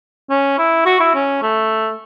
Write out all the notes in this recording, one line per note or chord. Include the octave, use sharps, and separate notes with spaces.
C#4
E4
F#4
E4
C#4
A3